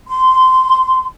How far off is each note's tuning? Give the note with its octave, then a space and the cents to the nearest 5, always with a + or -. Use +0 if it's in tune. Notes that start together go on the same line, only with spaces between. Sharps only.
C6 -15